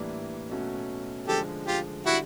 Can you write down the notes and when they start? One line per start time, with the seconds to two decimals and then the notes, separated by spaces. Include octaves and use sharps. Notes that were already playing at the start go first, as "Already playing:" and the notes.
Already playing: A2 E3 G3 A#3 D4
0.50 B2 F#3 A3 C#4 F#4
1.28 D3 F3 G#3 G4 A4
1.67 F4 G4
2.06 D3 G3 E4 F#4